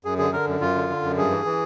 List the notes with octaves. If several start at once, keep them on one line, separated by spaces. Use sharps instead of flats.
F#2 G#4
D3 G#4
D3 A#4
F#2
F#2 F4
D3
D3
F#2
G2 G#4
E3
E3